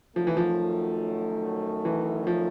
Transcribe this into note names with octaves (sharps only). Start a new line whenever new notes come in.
F#2 D#3 F3 F#3 A3
E3
F3
E3
F3